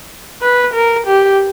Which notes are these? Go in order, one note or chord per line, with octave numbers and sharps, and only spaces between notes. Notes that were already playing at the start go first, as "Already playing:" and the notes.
B4
A#4
G4